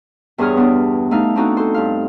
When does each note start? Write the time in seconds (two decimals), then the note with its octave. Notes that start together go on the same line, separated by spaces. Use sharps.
0.38 E2 G2 G#4 C#5 D#6 F6
0.57 B3 D4
1.11 A3 D#4 F5
1.35 C4 D4 D#4 F#4 A4
1.57 A4 C5
1.74 G2 F5